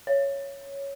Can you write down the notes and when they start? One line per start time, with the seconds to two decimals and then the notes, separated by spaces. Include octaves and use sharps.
0.07 C#5